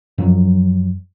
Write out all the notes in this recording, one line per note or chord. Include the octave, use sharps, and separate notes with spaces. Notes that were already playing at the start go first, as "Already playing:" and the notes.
F#2 F3 F#3